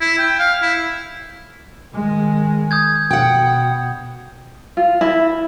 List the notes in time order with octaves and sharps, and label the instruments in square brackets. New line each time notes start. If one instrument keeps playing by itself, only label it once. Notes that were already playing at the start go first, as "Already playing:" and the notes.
[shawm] E4
G5
F5
E4
[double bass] D#3 G#3
[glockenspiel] D#6 G6 G#6
[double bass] B2 [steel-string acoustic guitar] F#5 G5 [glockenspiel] D#6
[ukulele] F4
E4